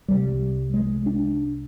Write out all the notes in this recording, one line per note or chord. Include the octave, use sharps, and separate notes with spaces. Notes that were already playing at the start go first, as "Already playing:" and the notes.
C2 C3 G3
G#3
D4